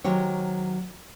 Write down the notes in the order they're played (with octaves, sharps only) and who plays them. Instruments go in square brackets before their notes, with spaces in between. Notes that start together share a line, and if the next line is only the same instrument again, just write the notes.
[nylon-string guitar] D#3 F#3 G#3 G4 C5 C#5